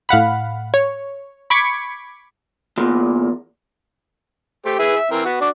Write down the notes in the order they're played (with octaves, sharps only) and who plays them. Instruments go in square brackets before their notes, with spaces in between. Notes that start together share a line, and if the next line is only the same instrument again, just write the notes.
[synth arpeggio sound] A2 F5 F#5 B5
C#5
B5 C#6 D6 G#6 B6 C#7
[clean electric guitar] E2 A#2
[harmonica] A3 G4 C5
E4 G#4 B4
E5
E3 C4 A#4
B3 F#4
D4 F#4 D5